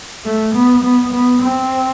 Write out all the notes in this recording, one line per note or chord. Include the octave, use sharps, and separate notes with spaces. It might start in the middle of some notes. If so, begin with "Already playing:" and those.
A3
B3
B3
B3
C4